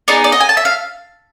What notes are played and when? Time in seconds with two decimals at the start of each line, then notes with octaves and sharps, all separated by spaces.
0.08 B3 D#4 G#4 D5
0.24 D5
0.32 D#5
0.40 G#5
0.49 A5
0.57 E5
0.65 F5